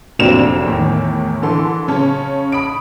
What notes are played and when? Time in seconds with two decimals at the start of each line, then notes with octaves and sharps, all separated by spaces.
0.19 F1 F#3 A#3 C4 D4 E7
0.66 E2 A2 D#3
1.42 D3 E3 A4 C6
1.88 C#3 C#4 A5
2.52 B5 D#6 D7